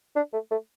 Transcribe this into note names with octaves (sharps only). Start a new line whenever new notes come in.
D4
A3
A3